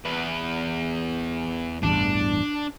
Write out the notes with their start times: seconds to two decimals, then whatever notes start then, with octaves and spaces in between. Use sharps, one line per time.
0.05 E2 B4
1.83 A1 E2 G2 D4